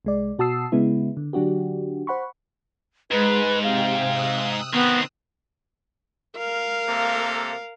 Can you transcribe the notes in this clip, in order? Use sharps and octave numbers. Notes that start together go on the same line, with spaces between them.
C2 G#3 D5
B2 F#4 A5 D#6 E6 C7
C#3 G#3 B3 E4
D3
D3 F#3 D4 F#4 G4
C5 F#5 B5 C#6
G#2 G#3 B4
C3 F5 G5
D#6 E6 F#6
D#3 B3 C4
A#4 F5
C3 A#3 A4